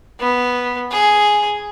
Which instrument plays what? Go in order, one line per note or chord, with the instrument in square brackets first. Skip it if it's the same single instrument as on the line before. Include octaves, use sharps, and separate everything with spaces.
[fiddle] B3
G#4